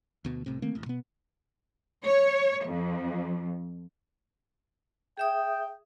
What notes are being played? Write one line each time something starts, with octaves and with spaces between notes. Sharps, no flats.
D2 B2
C2 A2 C3
D#3 A3 A#3 C4
E1 A1
B2 B3
C#5
F2
G#4 E5 G5 D#6